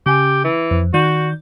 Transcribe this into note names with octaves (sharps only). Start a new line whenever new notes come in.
C#3 G4 G#5
E3
F2
D#3 F#4 D5 G6